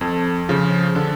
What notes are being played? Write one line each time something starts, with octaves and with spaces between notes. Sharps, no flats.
F2 A4
C#3 F3
D3 A4